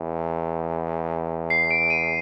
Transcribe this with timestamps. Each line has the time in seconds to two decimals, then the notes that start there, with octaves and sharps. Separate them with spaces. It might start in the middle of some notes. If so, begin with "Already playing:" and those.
Already playing: E2
1.50 C7
1.71 D7
1.90 D#7